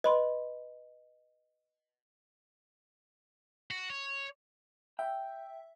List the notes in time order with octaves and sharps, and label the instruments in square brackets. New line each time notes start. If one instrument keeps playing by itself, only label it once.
[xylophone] B4 B5 C6 [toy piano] D#5
[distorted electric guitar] F#4
C#5
[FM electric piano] E5 [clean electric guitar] G5